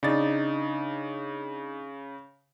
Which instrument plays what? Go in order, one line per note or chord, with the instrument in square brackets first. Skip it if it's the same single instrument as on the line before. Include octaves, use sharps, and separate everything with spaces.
[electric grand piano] C#3 A6 [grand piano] D4 D#4